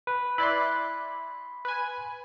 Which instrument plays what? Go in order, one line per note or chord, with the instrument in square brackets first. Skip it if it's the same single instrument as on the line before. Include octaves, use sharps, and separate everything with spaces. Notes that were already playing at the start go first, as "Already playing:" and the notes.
[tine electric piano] B4
[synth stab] E4 D5 F#6 [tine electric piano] B5 C6
[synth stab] B4 G#5